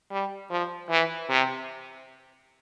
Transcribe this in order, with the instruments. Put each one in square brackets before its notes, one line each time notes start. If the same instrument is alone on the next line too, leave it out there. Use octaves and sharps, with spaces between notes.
[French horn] G3
F3
E3
C3